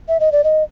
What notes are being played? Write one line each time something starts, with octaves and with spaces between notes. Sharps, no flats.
E5
D#5
D5
D#5